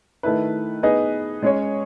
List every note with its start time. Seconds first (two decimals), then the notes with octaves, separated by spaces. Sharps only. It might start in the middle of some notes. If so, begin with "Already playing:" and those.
0.23 D#3 A3 E4 B4
0.83 B3 D#4 G#4 B4 D#5
1.43 G#3 C#4 G#4 C#5